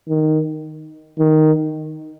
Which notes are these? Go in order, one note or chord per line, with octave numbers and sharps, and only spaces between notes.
D#3
D#3